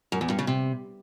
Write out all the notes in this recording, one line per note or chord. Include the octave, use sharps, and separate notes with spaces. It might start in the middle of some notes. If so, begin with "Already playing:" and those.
F#2
E2
G2
C#3
C3